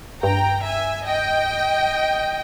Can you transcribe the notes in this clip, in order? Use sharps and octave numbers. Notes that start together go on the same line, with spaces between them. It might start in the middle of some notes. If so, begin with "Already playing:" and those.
G2 G5 A#5
E5 G#5
D#5 G5